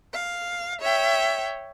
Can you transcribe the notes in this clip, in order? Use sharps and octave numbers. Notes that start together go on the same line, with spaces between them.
F5
C#5 E5 G5